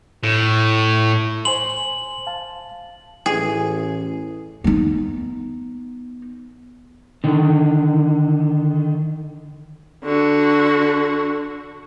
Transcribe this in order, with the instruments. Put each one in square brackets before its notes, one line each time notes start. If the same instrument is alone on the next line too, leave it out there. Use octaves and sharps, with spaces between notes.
[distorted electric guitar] A2
[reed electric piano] C5 G#5 C6 [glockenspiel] F#7
[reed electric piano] F5 A5
[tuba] A1 [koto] G#4
[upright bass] B3 D#4
[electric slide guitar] D3 D#3
[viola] D3 F#4